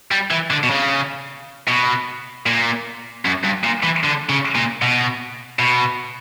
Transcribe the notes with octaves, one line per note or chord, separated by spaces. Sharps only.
G3
E3
D3
B2
C#3
B2
A#2
F#2
G2
A#2
E3
D3
C#3
A#2
B2
B2